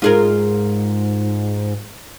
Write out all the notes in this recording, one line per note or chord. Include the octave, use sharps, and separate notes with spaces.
G#2 F4 G#4 A#4